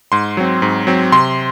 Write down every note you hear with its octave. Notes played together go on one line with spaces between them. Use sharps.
G#2 C6
F#3 C4
G#2
F#3 C4
C3 C6